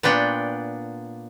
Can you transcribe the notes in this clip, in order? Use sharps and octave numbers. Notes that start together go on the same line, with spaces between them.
A#2 B3 D4 G5